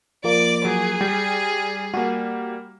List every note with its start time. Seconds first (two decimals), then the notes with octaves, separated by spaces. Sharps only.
0.24 F3 A#3 D5 D6
0.65 F#3 G#4
1.01 G3 G5
1.94 G3 A#3 F#4